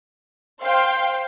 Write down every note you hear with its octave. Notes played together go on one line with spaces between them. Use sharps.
C5 F5 G5 C6